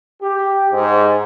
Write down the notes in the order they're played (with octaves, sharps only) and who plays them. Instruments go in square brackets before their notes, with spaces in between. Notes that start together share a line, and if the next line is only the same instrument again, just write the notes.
[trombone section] G4
G#2